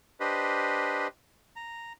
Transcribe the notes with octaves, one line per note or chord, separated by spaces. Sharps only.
D4 G4 B4 C5 D#5
A#5